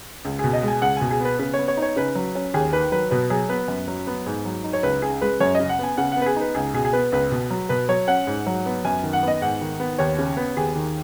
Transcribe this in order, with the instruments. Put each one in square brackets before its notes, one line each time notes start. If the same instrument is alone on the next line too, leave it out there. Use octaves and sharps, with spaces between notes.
[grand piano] C#2
B2 G#4
D#5
G#3
G#5
C#2 F#5
B2 G#5
G#4
B3 B4
C#3 B4
B3 C#5
C#5
D#4
C#5
C#3 B4
F#3
C#4
D#2 G#4
D#3 B4
F#3 B4
B2 B4
F#3 G#4
B3 B4
F#2
F#3
B3
G#2
F#3
D#4
C#5
C#2 B4
C#3 G#4
G#3 B4
F#2 C#5
D#5
C#3
F#5
B3 G#5
C#3 F#5
B3 F#5
B4
G#4
D#4 B4
C#2 G#4
B2 G#4
G#4
B3 B4
C#2 B4
B2
F#3
B2 B4
F#3 C#5
C#4 F#5
G#2
F#3
B3
F#2 G#5
D#3
F#5
B3
D#5
G#2 F#5
D#3
B3
D#2 C#5
C#3
B3
D#2 G#4
D#3